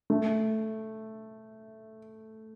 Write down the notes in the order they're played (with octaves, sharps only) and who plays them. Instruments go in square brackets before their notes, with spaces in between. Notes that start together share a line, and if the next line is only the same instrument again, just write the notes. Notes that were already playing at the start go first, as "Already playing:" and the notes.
[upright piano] A3